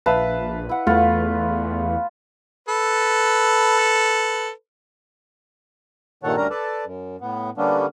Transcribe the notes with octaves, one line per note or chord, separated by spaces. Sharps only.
A#1 B4 E5 F5 A5
E4 F#5
E2 A3 F4 B4
A4 B4
G2 A#2 D#3 A4 C#5 F#5
D2 G3 C#4 D4 A#4 A#5
A4 B4 D5 A5
F#2
A2 B3
D3 G3 A#3 B3 C#4 D4